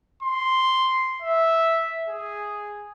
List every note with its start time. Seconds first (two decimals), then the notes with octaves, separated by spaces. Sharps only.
0.22 C6
1.22 E5
2.09 G#4